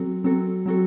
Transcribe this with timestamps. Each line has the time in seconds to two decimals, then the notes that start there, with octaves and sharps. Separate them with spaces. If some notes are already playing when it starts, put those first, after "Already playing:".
Already playing: F#3 C4 F#4 A4
0.24 F#3 C4 F#4 A4
0.66 F#3 C4 F#4 A4